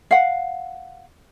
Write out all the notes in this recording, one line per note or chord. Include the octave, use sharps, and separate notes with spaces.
F5 F#5